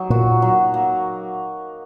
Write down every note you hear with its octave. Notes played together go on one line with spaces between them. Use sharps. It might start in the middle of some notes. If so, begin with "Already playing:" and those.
Already playing: F#3 D#4
A#2 F#4
F#3
A#3